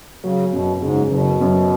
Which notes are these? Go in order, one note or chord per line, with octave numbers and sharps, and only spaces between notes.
C#3 F#3
F#2 B2
G#2 C#3
F#1 B2
F#2